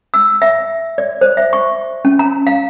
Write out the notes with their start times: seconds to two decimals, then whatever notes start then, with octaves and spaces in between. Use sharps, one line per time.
0.14 E6
0.42 E5
0.98 D5
1.21 C5
1.37 E5
1.53 C#6
2.05 C#4
2.19 A#5
2.47 F5